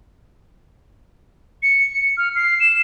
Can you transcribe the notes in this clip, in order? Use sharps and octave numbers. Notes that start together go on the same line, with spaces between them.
C#7
F6
C7
E7